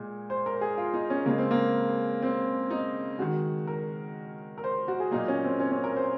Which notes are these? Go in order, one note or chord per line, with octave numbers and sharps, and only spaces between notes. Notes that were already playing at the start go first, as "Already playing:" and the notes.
Already playing: A#2 G#3
C5
A#4
G#4
F4
D#4
C#4
C#3 G#3 A#3
C4
A#3
C4
D#4
D#3 G#3 F#4
A#4
A#4
C5
F#4
G#4
A#2 F#3 A#3 D#4
C#4
C4
C#4
C#4
A#4
C5